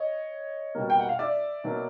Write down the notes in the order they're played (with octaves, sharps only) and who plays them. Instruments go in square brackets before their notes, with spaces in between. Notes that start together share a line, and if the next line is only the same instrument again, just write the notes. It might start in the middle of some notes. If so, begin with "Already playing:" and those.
Already playing: [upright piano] C#5 D#5
B2 G3 A#3
G5
F#5
F5
D5 E5
B2 F#3 A#3